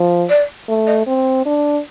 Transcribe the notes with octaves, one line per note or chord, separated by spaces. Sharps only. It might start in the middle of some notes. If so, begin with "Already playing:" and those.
Already playing: F3
D5
A3
D#5
C4
D4